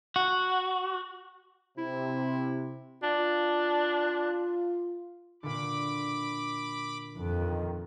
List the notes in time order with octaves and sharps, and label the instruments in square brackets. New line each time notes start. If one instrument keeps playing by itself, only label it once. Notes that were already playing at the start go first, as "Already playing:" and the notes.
[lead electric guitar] F#4
[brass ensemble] C3 [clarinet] E4
[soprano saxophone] D4 [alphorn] F4
[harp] A#2 D3 [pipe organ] B5 D6
[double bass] F2 [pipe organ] D#3